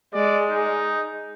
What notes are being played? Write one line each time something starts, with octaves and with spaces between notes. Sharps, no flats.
G#3 D5
D#4